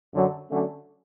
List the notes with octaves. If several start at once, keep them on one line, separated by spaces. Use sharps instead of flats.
F#2 D3 F#3
D3 F#3 A3 C#4